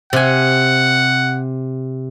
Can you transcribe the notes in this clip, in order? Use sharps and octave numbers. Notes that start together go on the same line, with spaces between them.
C3 F#5 G#5